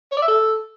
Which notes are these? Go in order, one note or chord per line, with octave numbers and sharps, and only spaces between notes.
C#5
D5
E5
A4